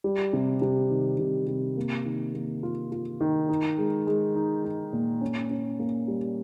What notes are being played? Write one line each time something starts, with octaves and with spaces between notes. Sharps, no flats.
G3
C3
C3
D#3
C3
C3
A#3
D#3
A#3
F4
F4
D#3
D#4
G#3
G#3
D#4
D#4
A#2
C#4
C#4
A#3
G3